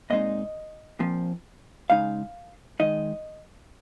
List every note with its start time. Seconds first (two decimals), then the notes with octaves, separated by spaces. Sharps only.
0.10 A#2 G#3 C4 D#4 D#5
0.99 A#2 F3 C4
1.90 C#3 G#3 D#4 F5
2.80 D#3 G#3 D#4 D#5